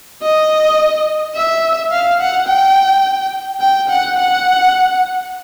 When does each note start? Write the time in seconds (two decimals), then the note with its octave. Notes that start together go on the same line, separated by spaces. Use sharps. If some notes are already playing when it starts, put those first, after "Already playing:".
0.22 D#5
1.36 E5
1.92 F5
2.20 F#5
2.48 G5
3.61 G5
3.89 F#5
4.18 F#5